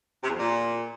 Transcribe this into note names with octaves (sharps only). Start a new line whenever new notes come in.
C3
E2
F2
A#2